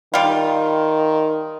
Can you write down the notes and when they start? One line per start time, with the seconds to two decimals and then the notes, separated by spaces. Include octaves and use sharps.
0.14 D#3 G3 F4